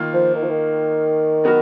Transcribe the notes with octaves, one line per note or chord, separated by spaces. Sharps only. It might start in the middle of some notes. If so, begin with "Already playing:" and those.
Already playing: D#3 A#3 F4
F3
D#3
F3
D#3
F#3 B3 F#4 A#4